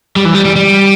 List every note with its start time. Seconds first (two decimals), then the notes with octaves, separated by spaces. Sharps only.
0.16 G3
0.25 E3
0.35 G3
0.45 G3
0.56 G3